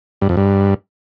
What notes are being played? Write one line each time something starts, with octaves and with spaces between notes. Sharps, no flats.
G2
F2
G2